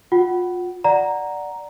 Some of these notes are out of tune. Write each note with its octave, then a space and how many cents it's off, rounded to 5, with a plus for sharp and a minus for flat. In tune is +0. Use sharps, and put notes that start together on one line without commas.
F4 +30 F#5 +30
D5 +0 F#5 +0 A#5 +0